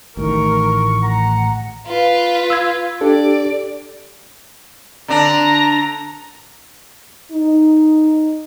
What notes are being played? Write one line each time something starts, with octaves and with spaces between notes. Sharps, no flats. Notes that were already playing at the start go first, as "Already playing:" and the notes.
A1 A2 D#3 A#4 C#6
F#5 A#5
F4 B4
E6 G#6
D4 G4 A4 D5
D3 D4 A#5
D#4